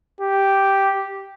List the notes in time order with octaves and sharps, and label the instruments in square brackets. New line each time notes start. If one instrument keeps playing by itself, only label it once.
[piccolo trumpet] G4